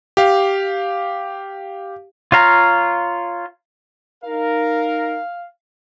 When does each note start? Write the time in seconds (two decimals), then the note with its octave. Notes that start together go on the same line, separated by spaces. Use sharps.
0.17 G4 F5
2.32 F4 C#5 F5 A#5
4.24 D#4 A#4 F5